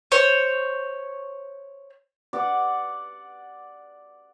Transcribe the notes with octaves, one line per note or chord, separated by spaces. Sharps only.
C5 C#5
D5 F#5